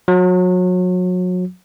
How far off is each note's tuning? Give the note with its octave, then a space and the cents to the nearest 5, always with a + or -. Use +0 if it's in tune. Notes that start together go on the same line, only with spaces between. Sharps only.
F#3 -30